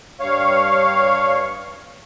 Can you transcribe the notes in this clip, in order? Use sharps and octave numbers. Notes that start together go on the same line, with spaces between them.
G2 C#5 F5